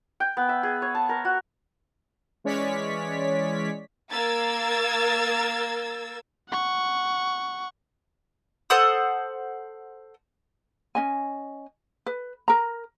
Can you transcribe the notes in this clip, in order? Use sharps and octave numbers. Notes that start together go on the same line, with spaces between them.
G5
B3
E5
G#4
C#5
A5
A#4
F#4
E3 G#3 C#4 C#5 D5 B6
A#3 A#4 E6 G#6 A6
F#5 C#6
A4 C5 F#5 D#6
C#4 D#5 G#5
B4
A#4 A#5